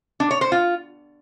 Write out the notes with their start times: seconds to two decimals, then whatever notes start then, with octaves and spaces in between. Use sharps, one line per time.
0.20 D4
0.31 C#5
0.41 C5
0.52 F4